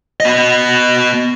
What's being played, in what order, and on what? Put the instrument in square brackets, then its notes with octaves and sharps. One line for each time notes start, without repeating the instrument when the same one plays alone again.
[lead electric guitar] B3 D#5